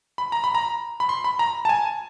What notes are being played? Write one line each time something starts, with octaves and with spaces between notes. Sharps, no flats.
B5
A#5
B5
A#5
B5
C6
B5
A#5
A5
G#5